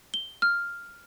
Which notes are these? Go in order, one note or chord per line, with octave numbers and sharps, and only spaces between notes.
G7
F6